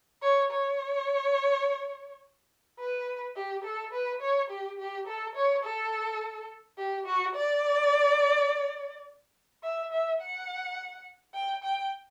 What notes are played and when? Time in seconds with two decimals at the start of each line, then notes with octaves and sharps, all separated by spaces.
0.22 C#5
0.51 C#5
2.80 B4
3.36 G4
3.64 A4
3.93 B4
4.21 C#5
4.50 G4
4.78 G4
5.07 A4
5.36 C#5
5.64 A4
6.78 G4
7.06 F#4
7.35 D5
9.63 E5
9.92 E5
10.21 F#5
11.34 G5
11.64 G5